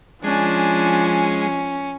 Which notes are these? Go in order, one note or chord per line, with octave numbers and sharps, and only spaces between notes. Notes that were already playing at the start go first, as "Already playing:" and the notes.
F3 G#3 C#4 D4